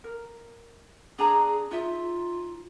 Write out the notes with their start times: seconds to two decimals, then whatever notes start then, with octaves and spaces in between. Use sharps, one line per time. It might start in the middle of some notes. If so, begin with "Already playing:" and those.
0.04 A#4
1.19 D4 G#4 G#5 A#5
1.71 D#4 F4 E5